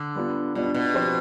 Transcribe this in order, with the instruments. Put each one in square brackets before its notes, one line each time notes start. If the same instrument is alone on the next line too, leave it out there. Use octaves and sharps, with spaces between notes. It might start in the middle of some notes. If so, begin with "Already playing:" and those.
Already playing: [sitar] D3
[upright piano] G3 B3 D4 F4
[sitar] B2 [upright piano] G3 B3 D4 F4
[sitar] B2
[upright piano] F3 C4 G4 C5